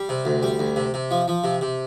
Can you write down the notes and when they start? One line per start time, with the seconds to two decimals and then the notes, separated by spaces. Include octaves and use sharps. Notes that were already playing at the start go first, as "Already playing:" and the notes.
Already playing: G3
0.09 C3
0.25 D2
0.43 G3
0.59 D2
0.76 C3
0.94 C3
1.11 F3
1.28 F3
1.44 C3
1.61 C3